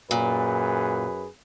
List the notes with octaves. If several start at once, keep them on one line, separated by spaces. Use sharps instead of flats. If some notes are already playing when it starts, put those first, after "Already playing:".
F#2 A#2 G#4 B4